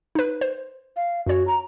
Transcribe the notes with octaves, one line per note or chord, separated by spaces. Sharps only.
D#4 B4
C5
F5
F#2 F#4 C#5
A#5